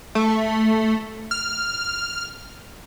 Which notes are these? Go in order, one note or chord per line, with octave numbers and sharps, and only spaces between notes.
A3
F6